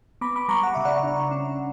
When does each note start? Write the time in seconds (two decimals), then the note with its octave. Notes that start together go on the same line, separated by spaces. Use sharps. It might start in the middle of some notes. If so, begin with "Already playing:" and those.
0.21 B3 B5 D6
0.36 B5 D6
0.48 G3 A#5 C#6
0.63 F#5
0.75 C#3 E5
0.85 D5 F#5
1.03 D4
1.31 C#4